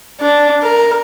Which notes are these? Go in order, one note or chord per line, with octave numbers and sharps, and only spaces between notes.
D4
A#4